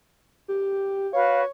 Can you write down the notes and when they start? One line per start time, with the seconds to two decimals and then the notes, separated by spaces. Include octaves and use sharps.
0.48 G4
1.13 F#4 B4 C#5 F5